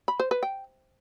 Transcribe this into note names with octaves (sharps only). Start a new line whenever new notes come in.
B5
C5
B4
G5